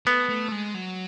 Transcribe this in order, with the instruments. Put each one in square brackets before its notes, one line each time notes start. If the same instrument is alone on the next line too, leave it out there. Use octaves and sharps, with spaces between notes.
[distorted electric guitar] A3 [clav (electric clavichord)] B3
[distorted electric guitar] A3
G#3
F#3